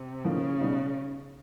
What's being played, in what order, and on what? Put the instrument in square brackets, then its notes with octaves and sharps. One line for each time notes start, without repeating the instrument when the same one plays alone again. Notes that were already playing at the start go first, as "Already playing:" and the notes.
Already playing: [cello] C3
[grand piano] A2 F3 A#3 D#4 [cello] C#3
[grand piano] B2 G3 B3 D#4